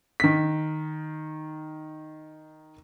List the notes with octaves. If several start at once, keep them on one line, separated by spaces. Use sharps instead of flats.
D#3 B6